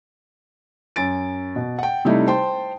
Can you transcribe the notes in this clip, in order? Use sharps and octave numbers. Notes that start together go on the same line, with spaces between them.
F#2 G#5 A6 D7
B2
F#5 G5
C3 G3 A3 D#4 E4
C5 G5 A5 C6